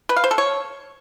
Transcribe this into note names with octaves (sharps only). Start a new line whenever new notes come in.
B4
F5
C5
A4
C#5